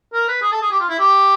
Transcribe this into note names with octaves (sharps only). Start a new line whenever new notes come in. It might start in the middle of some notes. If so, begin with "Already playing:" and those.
A#4
B4
G#4
A4
G#4
G4
F4
E4
G4